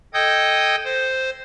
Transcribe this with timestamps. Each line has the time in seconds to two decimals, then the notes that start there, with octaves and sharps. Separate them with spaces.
0.14 A4 D#5 G5 D#6 G6 G#6
0.85 C5